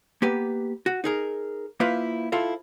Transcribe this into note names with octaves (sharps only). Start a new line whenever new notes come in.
A#3 B3 G4 B4
F#4
D#4 G#4 A#4
A#3 E4 F4 B4 C5
E4 F4 A4 C5